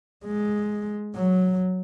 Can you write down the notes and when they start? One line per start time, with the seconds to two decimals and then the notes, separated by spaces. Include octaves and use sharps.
0.25 G#3
1.16 F#3